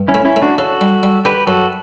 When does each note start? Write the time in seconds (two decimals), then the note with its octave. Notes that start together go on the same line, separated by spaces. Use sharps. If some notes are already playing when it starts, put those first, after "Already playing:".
Already playing: G2
0.08 C#4 E4
0.14 A3
0.25 C#4 E4
0.36 A3
0.42 D4 F#4
0.58 C#3 F#4 A4
0.81 G3
1.03 G3
1.25 D3 G4 B4
1.47 F#2 F#4 A4